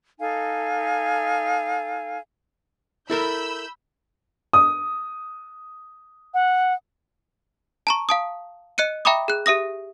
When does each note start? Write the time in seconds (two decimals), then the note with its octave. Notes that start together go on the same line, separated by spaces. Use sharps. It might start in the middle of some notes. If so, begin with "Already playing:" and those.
0.19 D#4 A4 F5 G#5
3.10 E4 A4 A#4 B5 E6 G6
4.53 D#6
6.34 F#5
7.87 A5 A#5 C#6
8.09 F5 A5 D#6
8.78 D#5 F#6 C#7 D#7
9.05 E5 G5 A#5 B5 D6 D#6
9.28 G#4 F#6
9.46 G4 E5 D#6 A#6